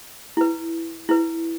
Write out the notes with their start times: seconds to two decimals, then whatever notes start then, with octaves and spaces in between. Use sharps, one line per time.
0.37 E4 B4
1.09 E4 B4